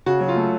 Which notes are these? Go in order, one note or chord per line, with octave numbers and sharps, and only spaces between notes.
C#3 F#4
F#3
F4
A3